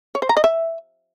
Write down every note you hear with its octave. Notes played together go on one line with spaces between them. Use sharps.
C#5
C5
A#5
D#5
E5